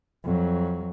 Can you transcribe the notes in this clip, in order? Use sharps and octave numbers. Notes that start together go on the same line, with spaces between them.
F2 F#3